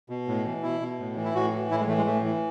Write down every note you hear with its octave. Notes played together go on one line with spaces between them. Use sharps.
B2
A2
E3
B2 E4
B2
A2
E3
E4
A2 F#4
E3
A2 E4
G#3
E3 A3
G#3
A2 A3
E3